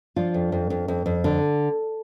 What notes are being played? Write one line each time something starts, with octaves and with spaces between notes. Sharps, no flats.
F3 D4 F4
F2
F2
F2
F2
F2
D3